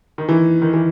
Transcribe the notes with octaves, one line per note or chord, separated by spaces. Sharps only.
D#3
E3
D#3
E3